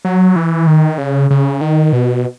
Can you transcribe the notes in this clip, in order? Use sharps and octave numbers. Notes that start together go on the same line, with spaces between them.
F#3
E3
D#3
C#3
C#3
D#3
B2